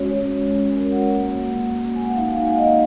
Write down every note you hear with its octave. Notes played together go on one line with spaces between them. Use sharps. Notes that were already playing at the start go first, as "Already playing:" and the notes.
Already playing: G#3 C#4 F#4 C#5
G#3
C#4
G#3
G#3 A#4
F#4 F#5
A#3
A#3
A#3
A#3
A#3 G#5
F#5
D#4 F5
G#5
D#4 F5
A#3 D#5